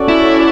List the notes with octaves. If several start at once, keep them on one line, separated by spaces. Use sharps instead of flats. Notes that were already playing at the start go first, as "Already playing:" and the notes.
Already playing: C#4 F#4 A4 D5
E4